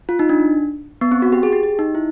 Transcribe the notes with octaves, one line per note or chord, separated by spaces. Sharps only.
F4
D#4
D4
B3
C4
F#4
G4
G#4
G4
G4
D#4
E4